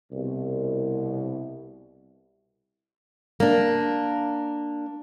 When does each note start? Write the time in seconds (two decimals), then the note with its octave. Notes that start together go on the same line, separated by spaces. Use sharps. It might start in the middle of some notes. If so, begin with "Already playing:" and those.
0.12 C2 B2
3.40 A#3 D4